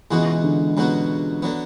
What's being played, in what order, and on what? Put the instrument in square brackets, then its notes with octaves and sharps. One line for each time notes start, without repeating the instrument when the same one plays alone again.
[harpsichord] C#2 B2 G#3 B3 F#4 [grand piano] E3
[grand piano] D3
[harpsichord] C#2 B2 F#3 B3 F#4
D3 F#3 B3